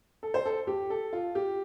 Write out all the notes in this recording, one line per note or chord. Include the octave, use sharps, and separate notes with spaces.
A4
C5
A4
G4
A4
F4
G4